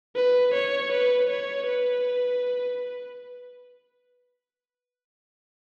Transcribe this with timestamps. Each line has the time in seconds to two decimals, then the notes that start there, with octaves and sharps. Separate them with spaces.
0.16 B4
0.54 C#5
0.92 B4
1.30 C#5
1.67 B4